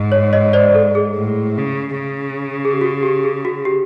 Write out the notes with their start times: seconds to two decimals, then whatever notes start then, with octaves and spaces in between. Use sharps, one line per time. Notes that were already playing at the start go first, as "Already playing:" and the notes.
Already playing: G#2
0.12 C#5
0.33 C#5 D#5
0.53 C5 D5
0.75 A4
0.95 G#4
1.16 A2
1.58 C#3
1.99 C#3
2.65 G#4
2.73 G4
2.81 F#4
3.03 G4
3.24 G#4
3.45 F#4
3.65 G4